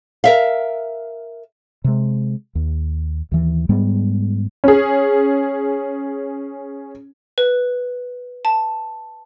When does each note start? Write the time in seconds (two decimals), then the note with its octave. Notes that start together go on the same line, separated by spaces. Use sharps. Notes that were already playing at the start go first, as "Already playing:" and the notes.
0.24 A#4 E5 F5
1.84 C3 G#3
2.55 D#2
3.32 D#2 E3
3.69 G#2 G3 G#3 B3
4.64 C#4 G#4
7.38 B4
8.45 A5